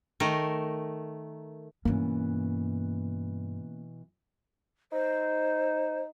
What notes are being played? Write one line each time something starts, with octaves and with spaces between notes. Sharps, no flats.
D#3 A3 A#4
G2 B2 E3 A3 A#3 C#4
D#4 C5